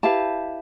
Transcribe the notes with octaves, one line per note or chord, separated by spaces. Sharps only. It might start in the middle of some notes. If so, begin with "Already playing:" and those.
E4 G4 B4 F5 A5